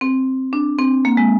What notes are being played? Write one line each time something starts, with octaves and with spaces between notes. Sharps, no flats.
C4
D4
C4
A#3
G#3